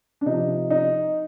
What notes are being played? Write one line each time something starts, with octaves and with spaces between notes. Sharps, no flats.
D4
C3 F3 D#4
D#4